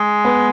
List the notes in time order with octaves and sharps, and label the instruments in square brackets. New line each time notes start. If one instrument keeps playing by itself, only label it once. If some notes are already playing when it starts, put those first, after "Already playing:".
Already playing: [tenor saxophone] G#3
[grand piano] B3